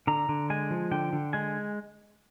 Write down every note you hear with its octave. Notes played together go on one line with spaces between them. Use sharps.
D3 A#5
D3
G#3 G#5
F3
D3 G5
D3
G#3 G#5